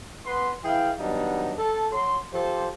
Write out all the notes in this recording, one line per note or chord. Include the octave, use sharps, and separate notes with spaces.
B3 B4 C6
E3 E4 G#4 F5 G5
D#3 F#3 G3 B3 D4 D#4
A4
F#3 C6
F3 G4 A4 C5